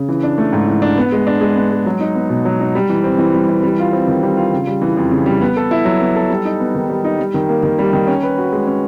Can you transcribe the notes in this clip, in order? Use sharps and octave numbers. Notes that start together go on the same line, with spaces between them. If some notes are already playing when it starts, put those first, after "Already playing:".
Already playing: C#3
E3
D4
A3
G#2
E3
D4
B3
G#3
D4
G#3
B3
G#3
F#3
D#4
B3
B2
F#3
D#4
G3
E3
C4
E3
G3
E3
G3
F4
C4
D#3
G3
F4
C#3
G3
E3
F2
C#3
G3
B3
A4
E4
F#3
B3
A4
G3
D#4
B3
D#3
G3
D#4
G3
D#3
A#3
D#3
G3
D#3
C#4
B4
F#4
G#3
C#4